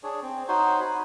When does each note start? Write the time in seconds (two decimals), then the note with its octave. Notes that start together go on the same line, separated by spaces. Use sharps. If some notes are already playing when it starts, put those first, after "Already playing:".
0.03 D4 G#4 C#5
0.22 C4
0.48 D#4 F#4 C5 C#5
0.80 F#4 B5